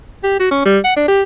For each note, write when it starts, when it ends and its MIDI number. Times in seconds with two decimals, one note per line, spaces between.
0.24 0.36 67
0.39 0.50 66
0.51 0.65 61
0.65 0.79 55
0.84 0.93 78
0.96 1.08 62
1.08 1.23 67